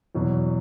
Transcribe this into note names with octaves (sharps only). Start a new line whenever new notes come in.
E2 B2 F#3